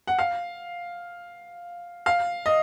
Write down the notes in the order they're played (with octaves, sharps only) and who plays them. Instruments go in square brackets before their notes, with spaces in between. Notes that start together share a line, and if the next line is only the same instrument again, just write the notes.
[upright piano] F#5
F5
F5
D#5